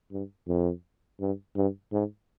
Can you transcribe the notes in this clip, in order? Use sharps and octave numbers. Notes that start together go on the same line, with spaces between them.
G2
F2
G2
G2
G#2